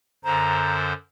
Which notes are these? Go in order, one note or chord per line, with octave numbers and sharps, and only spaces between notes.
F#2 D3 C5 A#5